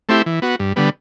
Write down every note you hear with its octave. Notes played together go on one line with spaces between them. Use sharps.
A3 C4 E4 G4
E3
B3 F#4
G2
D3 G3 B3